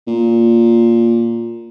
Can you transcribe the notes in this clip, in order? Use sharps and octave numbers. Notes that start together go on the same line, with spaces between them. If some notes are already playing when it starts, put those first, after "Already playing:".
A#2